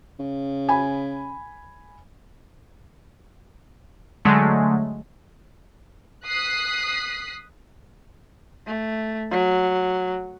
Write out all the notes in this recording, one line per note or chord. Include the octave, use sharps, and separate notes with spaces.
C#3
G#5 B5
D3 F#3 G#3 A3
D#6 F#6 B6 C7
A3
F#3